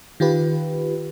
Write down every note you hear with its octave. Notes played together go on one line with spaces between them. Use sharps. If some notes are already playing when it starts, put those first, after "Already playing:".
D#3 F4 G4 B4